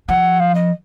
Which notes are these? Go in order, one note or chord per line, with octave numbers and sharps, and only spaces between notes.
F3 F#5
F5
D#5